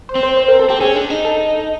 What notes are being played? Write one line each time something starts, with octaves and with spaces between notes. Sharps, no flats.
C5
C4
C5
C5
A#4
A4
C4 G4
C#4 G#4
D4
D#4
A4